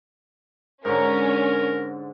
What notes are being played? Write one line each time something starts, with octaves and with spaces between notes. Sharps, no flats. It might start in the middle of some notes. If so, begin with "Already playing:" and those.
G#2 D3 C#4 A#4